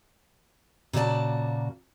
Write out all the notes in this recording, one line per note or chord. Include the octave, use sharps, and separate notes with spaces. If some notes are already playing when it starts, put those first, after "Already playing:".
A#2 C#3 A#3 F#4 D5 A5